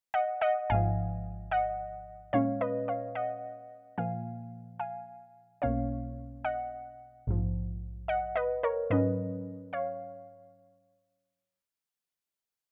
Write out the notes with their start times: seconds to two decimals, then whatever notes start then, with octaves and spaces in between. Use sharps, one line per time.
0.14 D#5 F#5
0.41 D#5 F#5
0.69 G#1 G#2 F3 F5 G#5
1.51 D#5 F#5
2.33 A#2 G#3 C#4 C#5 F5
2.61 B4 D#5
2.88 C#5 F5
3.15 D#5 F#5
3.98 A#2 F3 A#3 F5 G#5
4.80 F5 G#5
5.62 B1 B2 A#3 C#4 C#5 F5
6.44 D#5 F#5
7.27 A#1 G#2 F3
8.08 D#5 F#5
8.36 B4 D#5
8.63 A#4 C#5
8.90 G#2 F#3 C#4 B4 D#5
9.73 C#5 F5